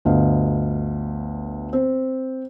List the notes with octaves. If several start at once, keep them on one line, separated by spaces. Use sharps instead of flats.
G1 D2 D#5 F5
C4